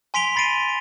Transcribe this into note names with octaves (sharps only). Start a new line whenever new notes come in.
G#5 C6 B6 D7 F7 G7
B5 A6 C7 D7 D#7